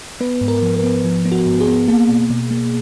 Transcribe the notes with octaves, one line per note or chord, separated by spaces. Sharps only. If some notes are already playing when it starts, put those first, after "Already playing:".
B3 B4
G#2
A#4
F3
A#4
B3
F3
B3
F#4
G#2
G#4
B3
A#3 G#4
B2
B2
A#3